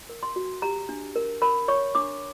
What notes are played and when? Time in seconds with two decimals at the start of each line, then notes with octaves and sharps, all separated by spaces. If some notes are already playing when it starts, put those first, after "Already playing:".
0.09 A#4
0.23 C6
0.36 F#4
0.62 G4 A#5
0.89 D4
1.16 A#4
1.42 A#4 B5
1.68 C#5 C#6
1.95 D4 D6